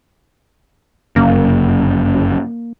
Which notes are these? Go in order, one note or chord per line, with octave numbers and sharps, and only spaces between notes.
G1 F#2 C#3 A#3